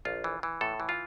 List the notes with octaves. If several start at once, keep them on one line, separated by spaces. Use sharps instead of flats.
A#1 F4
E3
E3
A2 A4
E3
F4